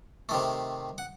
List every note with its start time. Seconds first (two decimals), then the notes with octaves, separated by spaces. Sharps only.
0.29 C3 D#3 A3
0.98 F#5